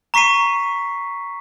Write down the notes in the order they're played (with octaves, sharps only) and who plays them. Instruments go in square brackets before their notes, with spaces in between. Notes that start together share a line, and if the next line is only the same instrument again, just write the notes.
[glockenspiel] A#5 C#6 B6 C7 D#7